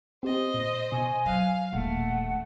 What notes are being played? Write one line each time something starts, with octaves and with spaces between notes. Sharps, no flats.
C4 G4 C5 D#5 A6
A#2
B2 G#5 C#6 E6
F#3 F5 F#6 A#6
D#1 A#1 A3 F#5